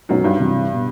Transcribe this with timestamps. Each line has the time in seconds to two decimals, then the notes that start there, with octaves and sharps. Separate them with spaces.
0.09 B1 F#2 B2 F#3 B3 D#4
0.24 G2
0.39 C2 C3 E3
0.72 B2